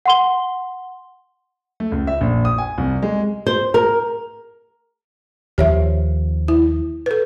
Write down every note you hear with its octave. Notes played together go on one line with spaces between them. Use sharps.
F#5 C6 G7
A3
C#2
E5
A#1
D#6
G#5
C2
G#3
C5
A#4
D#2 F3 G4 C#5 E5
E4
A4 B4